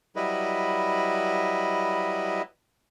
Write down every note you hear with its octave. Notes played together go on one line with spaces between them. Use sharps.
F#3 G3 E4 B4 D#5